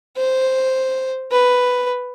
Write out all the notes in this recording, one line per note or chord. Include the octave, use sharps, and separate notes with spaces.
C5
B4